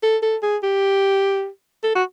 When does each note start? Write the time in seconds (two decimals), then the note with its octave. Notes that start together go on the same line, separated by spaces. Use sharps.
0.03 A4
0.23 A4
0.43 G#4
0.63 G4
1.83 A4
1.96 F#4